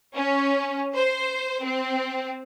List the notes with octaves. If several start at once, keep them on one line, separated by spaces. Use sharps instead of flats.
C#4
C5
C4